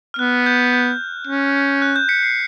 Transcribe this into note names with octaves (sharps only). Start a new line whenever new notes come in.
F6
B3 F#6
G6
G6
C#4
F#6
G6
B6 C#7
C7